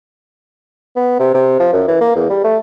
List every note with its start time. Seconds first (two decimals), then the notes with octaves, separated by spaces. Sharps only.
0.96 B3
1.19 C3
1.34 C3
1.60 F3
1.73 F#2
1.88 E3
2.01 A#3
2.16 E2
2.30 G3
2.44 A3